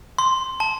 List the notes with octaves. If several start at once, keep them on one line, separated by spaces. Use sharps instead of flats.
C6
A5